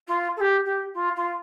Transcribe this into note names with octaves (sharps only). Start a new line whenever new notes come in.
F4
A4
G4
G4
F4
F4